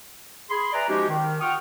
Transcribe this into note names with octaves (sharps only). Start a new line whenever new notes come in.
G#4 B5 C6
B4 D5 E5 G#5 A#5
F3 G#3 C#4 D#4 F#4 G4
D#3
F4 F#5 G5 C#6 D#6 F6